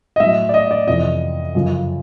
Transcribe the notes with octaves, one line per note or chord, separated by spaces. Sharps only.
D#5
A2 F#3 E5
D5
D#5
D5
F2 C3 E3 D#5
F#2 C#3 F3